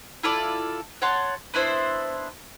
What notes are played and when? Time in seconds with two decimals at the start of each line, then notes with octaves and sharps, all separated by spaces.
0.23 E4 F4 A4 D5
1.02 C#5 F#5 A5 C6
1.54 B3 D4 E4 C5